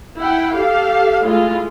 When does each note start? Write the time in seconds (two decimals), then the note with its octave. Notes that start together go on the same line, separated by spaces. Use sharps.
0.19 E4 F#5 G5
0.53 G4 A4 F5
1.22 G#3 A3 E4 F4